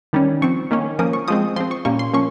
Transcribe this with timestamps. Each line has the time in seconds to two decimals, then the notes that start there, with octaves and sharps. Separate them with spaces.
0.13 D#3 G3 C#4
0.42 F3 C4 C#6
0.71 D#3 A#3 C#4
0.99 F3 A#3 C#4 D#6
1.13 C#6
1.28 F3 G#3 C4 D#6
1.56 F3 C4 C6
1.71 C#6
1.85 A#2 G3 A#3 C#4 C#6
1.99 C6
2.14 F3 A#3 C#4 C#6